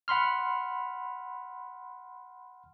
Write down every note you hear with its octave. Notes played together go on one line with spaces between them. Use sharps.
F#5 B5 C6 F6